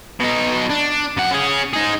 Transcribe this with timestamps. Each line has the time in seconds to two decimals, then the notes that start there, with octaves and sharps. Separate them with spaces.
0.20 B2 D#4
0.70 D4
1.17 F#2 F#5
1.31 C#4 G#4
1.73 D#4 G#4